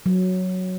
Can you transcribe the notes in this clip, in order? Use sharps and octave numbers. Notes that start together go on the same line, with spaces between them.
F#3